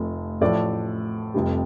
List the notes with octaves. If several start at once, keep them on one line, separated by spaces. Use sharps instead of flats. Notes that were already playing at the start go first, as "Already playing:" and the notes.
Already playing: F1 F2 C3 F3 A3
A1 A2 F3 A3 A4 D5
F1 F2 C3 G3